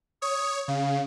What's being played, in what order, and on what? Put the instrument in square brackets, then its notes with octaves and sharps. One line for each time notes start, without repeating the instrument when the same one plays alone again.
[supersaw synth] C#5 [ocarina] D#6
[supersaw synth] C#3 [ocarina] F5